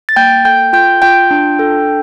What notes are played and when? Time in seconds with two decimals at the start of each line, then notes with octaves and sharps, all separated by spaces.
0.09 A6
0.16 A#3 G5 G6
0.45 A4 G5 G6
0.73 F4 G5 G6
1.02 F4 G5 G6
1.31 D4
1.59 A4